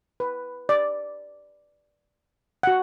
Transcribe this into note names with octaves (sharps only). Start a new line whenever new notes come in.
B4
D5
F#4 F#5